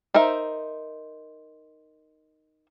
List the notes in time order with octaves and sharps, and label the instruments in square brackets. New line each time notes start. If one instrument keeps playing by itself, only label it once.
[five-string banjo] D#4 A#4 C5 E5